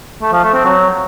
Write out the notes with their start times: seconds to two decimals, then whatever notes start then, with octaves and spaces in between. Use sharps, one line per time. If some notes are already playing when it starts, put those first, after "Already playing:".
0.22 A3
0.33 F3
0.43 A3
0.54 C4
0.65 F#3